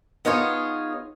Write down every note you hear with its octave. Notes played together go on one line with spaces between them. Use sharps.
B3 D#4 F4 G#4 C#5